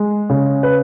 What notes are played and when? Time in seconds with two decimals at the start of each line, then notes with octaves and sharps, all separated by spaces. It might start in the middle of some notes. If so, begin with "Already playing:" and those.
Already playing: G#3
0.30 C#3
0.63 B4